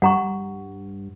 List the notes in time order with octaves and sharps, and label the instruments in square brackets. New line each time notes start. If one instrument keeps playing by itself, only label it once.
[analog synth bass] G2 [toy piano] F#5 A#5 C#6